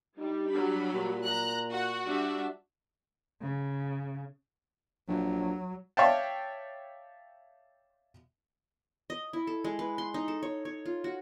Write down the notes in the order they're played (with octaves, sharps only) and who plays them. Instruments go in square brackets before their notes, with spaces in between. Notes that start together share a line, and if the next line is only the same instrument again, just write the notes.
[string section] G3 [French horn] D#4
[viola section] F#3 B5 [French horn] D4
[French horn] A#2
[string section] A#5 F#6
[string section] F#4 [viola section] F#5
[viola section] G3 D4 E5
[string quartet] C#3
[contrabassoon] A#1 [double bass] F#3
[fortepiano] C#5 D5 E5 F5 G5 A5
[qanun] D#5
E4
A4
G#3
B4
C6
D#4
A4
C#5
C#5
F4
F#4